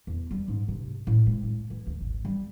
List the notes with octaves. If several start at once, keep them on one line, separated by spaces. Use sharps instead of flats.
E2
G3
G#2
C3
A2
G#3
A2
E3
D2
G#1
G3